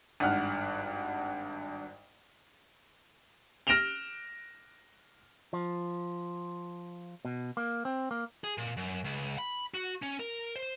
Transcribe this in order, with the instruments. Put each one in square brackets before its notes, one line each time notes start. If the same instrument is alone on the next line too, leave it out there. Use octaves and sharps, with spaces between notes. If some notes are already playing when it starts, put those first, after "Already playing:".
[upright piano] G#1 G2 F#5 F6
F6 A#6 D7 E7 F7 G7
[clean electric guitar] F3
B2
A#3
C4
A#3
[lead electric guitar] G#4
A#2
F#2
C#2
B5
F#4
C#4
A#4
C5